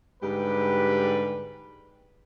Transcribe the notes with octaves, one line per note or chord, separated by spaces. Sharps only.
G#2 D3 G3 G4 B4